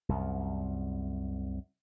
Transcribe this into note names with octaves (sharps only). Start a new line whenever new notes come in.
C2 F#2